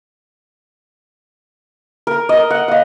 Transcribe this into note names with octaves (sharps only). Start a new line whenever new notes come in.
A#4
A#4 D#5
F#5
D#5 F5